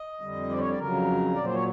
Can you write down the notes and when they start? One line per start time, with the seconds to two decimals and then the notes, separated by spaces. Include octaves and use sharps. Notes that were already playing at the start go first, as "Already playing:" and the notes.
Already playing: D#5
0.21 F2 D3 G3
0.49 C5 D5
0.59 C#5
0.69 D5
0.78 F2 C#3 F#3 A#4
1.35 A#2 F#3 D5
1.45 C5
1.54 C#5